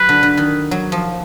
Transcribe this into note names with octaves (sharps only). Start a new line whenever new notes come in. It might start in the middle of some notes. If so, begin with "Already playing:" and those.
Already playing: F#3 B4
D3
D3
D#3
F#3
F3